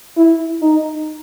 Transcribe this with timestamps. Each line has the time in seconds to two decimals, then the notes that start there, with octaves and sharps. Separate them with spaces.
0.17 E4
0.62 D#4